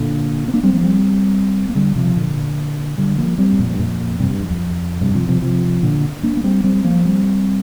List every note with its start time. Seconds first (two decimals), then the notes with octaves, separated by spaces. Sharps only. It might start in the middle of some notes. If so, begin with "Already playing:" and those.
Already playing: A#2 D3
0.48 C4
0.54 A#3 D4
0.63 G3 C4
0.73 F3 A#3
0.83 G3 C4
1.69 A#3
1.75 D3 G3
1.96 C3 F3
2.16 A#2 D3
2.98 D3 G3
3.18 F3 A#3
3.38 G3 C4
3.53 G2
3.59 F2 A#2
3.73 G2
3.79 F2 A#2
4.20 G2 C3
4.30 G2
4.40 F2
4.50 F2
5.01 G2 C3
5.15 C3 F3
5.28 C3 F3
5.42 C3 F3
5.82 A#2 D3
6.23 A#3 D4
6.37 A#3
6.44 G3 C4
6.64 G3 C4
6.84 F3 A#3
7.05 G3 C4